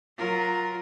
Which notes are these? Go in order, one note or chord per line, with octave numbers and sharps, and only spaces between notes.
F#3 F4 A#4